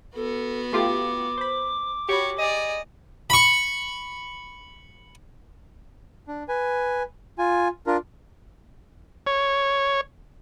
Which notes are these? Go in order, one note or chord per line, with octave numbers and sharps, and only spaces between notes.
B3 F#4 A4
A3 F4 G4 D6
C5 B5
F#4 G4 C#5 B5 C#6
G#4 D5 D#5
B5 C#6
D4
B4 G#5
F4 G#5
D4 F4 A#4
C#5